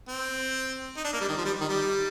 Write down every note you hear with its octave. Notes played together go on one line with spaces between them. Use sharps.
C4
D#4
D4
A#3
G3
D#3
F3
G3
D#3
G3